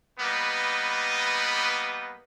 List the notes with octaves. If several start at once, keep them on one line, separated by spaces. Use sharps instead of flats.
G3 A#3 B3 B4 D#5